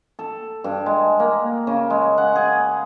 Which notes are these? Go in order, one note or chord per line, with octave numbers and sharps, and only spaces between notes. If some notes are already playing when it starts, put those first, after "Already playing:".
A4
G2
G#3
A#3
C#3
G#3
F#5
G#4